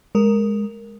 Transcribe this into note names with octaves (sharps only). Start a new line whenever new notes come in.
G#3 A#4